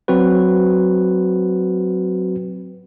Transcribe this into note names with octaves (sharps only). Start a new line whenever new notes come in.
F#3 C4 F#4 B4